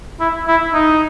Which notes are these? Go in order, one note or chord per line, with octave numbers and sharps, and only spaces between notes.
E4
E4
D#4